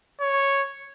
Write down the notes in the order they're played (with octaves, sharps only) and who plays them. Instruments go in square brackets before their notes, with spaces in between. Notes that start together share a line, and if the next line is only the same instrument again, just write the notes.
[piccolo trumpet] C#5